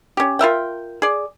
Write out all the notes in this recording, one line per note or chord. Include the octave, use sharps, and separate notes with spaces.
C#4 G4
F4 A#4 E5 G5
G#4 D5